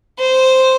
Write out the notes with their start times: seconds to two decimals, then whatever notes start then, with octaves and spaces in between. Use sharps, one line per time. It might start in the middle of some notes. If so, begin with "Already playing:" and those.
0.19 C5